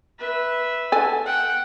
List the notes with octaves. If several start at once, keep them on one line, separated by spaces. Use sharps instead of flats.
B4 E5
A4 G#5
F#5 G5